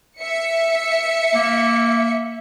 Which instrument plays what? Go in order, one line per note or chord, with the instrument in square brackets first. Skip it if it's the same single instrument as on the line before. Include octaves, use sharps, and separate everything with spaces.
[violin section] E5 C#7
[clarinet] A#3